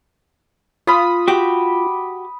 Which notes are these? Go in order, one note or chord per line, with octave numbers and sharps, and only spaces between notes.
F4 B5 D#6
F#4 G4